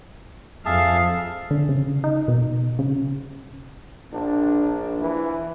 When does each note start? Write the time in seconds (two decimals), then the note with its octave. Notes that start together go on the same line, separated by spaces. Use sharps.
0.66 F2 G#4 E5 F5 A5
1.51 D3
1.69 C#3
2.04 D#4
2.28 B2
2.79 C#3
4.13 A#1 D4
5.01 E3